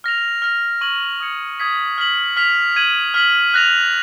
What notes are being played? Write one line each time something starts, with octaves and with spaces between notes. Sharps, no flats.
F6 A#6 F7
F6 A#6 F7
C#6 G#6 D#7 F#7
D#6 G#6 C#7
D#6 G#6 B6
F6 B6 F#7
F6 B6 F7
G#6 D#7 F#7
F6 B6 F#7
F#6 A#6 F7